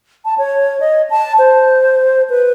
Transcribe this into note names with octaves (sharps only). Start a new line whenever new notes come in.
A5
C#5
D#5
A5
C5
B4